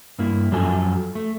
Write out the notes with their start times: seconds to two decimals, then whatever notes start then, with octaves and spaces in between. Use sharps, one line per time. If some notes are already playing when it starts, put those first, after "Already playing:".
0.19 G2 A#3 E4
0.51 F#2 F3 F#3 F#4 A4 G#5
1.15 A3